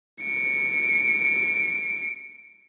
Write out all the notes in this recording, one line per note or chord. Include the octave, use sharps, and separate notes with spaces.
C#7 D7